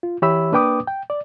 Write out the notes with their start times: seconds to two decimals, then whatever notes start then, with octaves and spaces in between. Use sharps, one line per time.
0.03 F4
0.22 E3 G4 C#5 E5 B5 E6
0.52 A#3 D4 B4 G5 D6 D#6
0.87 G5
1.10 D5